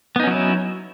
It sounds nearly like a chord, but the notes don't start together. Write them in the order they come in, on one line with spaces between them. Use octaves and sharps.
B3 D#4 C#4 F#3 E4